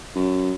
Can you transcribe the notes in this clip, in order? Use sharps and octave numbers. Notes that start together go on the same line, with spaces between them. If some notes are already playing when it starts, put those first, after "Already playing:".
F#2